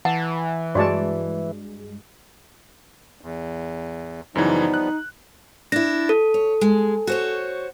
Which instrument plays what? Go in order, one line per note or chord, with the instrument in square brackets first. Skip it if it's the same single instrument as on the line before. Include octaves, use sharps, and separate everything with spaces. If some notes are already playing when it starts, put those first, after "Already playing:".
[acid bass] E3 [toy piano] F#5 [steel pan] A5
[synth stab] G2 G#3 [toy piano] F#4 [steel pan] C#5 D5 A5
[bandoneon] E2
[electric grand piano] F#2 C#3 E3 [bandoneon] F3 G3 B3 [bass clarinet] D#4
[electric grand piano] F#6
[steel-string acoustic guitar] D4 E4 [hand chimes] A#6
[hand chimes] A4
[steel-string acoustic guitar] C#5
G#3
F#4 C5 C#5